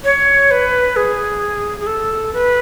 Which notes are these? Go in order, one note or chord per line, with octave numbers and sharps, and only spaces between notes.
C#5
B4
G#4
G#4
A4
B4